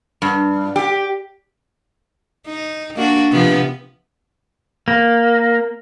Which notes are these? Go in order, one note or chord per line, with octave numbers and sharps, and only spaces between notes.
G2
G4
D#4
A#3 D4 F#4
C3 F3 B3
A#3